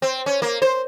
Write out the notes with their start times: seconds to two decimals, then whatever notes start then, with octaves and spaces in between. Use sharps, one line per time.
0.02 C4
0.26 C#4
0.42 A#3
0.62 C5